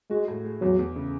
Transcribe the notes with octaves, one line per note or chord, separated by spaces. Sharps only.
G#3 F#4
A2
G#3
E2 F#3
E2
C#3